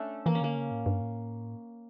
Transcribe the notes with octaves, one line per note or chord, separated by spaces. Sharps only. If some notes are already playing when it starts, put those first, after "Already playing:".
Already playing: A3 C#4 D4
E3 A#3
C#4
D3 A#3
C#3
A2
G2
A2